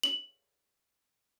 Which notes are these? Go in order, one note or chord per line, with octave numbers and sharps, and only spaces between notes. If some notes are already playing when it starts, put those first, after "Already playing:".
F#7